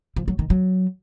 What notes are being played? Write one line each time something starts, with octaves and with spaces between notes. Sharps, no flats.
F3
F#3
D#3
F#3